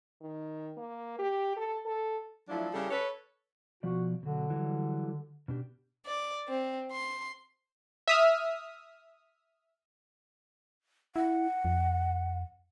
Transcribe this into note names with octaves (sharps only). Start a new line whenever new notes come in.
D#3
A#3
G4
A4
A4
F3 F#3 A3 D4 E4
C#3 G3 C#4 E4 G4 A4
A4 B4 C#5
B2 F3 F#4 D5
B2 D3 F#3
E3 F#3 G3
B2 D4 G4
D5
C4
C6
E5 D#6 F6
E4 F#5
F2